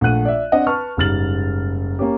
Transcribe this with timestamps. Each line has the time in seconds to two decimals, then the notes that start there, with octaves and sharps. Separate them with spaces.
0.01 A#1 A3 F#5 F#6 D#7
0.25 D5 E5
0.52 C4 D4 D#5 F#5
0.67 B4 A5 C#6 F6
0.97 F#1 G#2 G3 F6 A6 F#7
1.99 A#3 C#4 G4